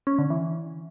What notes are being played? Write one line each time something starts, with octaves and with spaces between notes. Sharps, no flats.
C#4
D3
E3